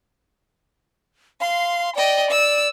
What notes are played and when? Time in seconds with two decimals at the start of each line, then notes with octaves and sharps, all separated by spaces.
1.40 F5 C6
1.96 D5 D#5 G5
2.31 E6